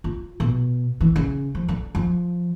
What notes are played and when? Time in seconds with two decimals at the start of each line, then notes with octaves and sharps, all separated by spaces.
0.04 F4
0.40 B2
1.01 E3
1.16 C#3
1.55 F3
1.68 D3
1.95 F3